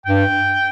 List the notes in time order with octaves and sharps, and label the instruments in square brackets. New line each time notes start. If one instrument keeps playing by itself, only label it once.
[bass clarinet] G2 [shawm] G5